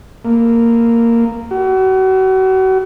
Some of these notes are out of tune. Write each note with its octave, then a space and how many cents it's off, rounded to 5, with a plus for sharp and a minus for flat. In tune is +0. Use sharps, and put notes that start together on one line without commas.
A#3 -10
F#4 +35